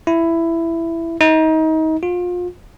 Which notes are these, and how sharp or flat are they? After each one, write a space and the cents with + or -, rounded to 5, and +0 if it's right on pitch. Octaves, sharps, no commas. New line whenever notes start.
E4 +10
D#4 +30
F4 +30